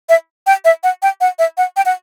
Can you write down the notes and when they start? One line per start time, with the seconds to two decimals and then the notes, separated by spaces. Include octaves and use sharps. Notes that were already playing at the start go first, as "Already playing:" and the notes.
0.09 E5
0.47 G5
0.65 E5
0.83 F#5
1.02 G5
1.21 F#5
1.39 E5
1.57 F#5
1.77 G5
1.85 F#5